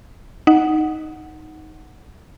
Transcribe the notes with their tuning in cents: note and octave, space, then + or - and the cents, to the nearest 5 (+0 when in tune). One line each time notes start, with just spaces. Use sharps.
D#4 +0 F#5 +0